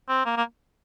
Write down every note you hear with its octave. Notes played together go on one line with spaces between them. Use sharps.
C4
A#3
A#3